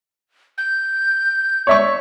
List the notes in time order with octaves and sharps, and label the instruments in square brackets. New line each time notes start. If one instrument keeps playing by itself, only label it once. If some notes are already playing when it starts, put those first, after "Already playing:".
[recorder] G6
[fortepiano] C#5 E5 C#6 [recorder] D5